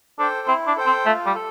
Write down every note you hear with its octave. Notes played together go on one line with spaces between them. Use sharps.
D4 A4 C5 G5
C4 E4
D4
A4 C5 G5
C4
A3 F4
G3
A4